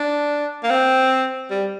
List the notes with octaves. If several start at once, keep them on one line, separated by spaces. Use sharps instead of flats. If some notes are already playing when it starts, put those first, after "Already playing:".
Already playing: D4
A#3
C4
G3